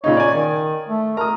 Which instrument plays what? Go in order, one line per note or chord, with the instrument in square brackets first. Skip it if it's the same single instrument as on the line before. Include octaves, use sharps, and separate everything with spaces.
[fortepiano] A#2 C#3 D#4 [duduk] C#5
[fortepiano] D5 G#5
[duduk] D#3
A3
[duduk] A#4 [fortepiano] A#5 D#6